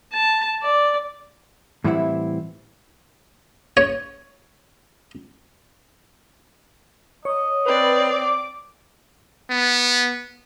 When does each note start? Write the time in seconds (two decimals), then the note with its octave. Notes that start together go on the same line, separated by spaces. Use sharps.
0.13 A5
0.63 D5
1.84 A2 E3 G3 C4 E4 F#5
3.77 C#5
7.25 C#5 D#5
7.66 C4 B4 D5
8.11 D6
9.51 B3